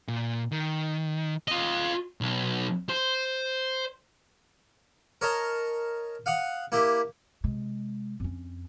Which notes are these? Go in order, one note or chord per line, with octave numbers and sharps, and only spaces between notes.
A#2
D#3
F4 D#5
B1
C5
A#4 C#5 D#5 A5
F5 F#5 D#6
A#3 E4 G4
C3 G#3
F2 C#4